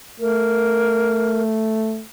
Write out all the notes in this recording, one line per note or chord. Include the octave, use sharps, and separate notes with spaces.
A3 A#4